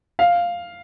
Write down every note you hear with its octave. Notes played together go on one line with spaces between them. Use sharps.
F5